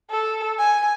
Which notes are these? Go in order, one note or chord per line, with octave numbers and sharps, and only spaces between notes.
A4
G#5